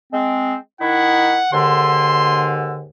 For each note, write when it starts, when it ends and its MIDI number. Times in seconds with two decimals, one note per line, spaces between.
0.13 0.56 56
0.13 0.56 60
0.81 1.41 51
0.81 1.41 63
0.81 1.41 64
0.81 1.53 78
1.53 2.88 39
1.53 2.88 44
1.53 2.88 50
1.53 2.54 84